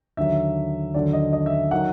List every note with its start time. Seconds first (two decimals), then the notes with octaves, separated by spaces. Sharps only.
0.17 D#2 D3 F#3 E5
0.94 D#2 D3 F#3 D5
1.13 D#5
1.33 D#5
1.46 E5
1.71 D#3 F#3 F#5